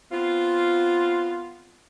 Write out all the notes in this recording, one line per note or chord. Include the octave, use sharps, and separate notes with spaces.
B3 C4 F4